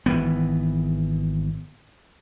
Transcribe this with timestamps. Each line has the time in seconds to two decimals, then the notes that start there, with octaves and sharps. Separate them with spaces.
0.06 G#1 E3 B3